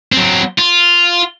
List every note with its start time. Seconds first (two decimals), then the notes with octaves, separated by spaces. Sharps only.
0.12 F#3 C4
0.58 F4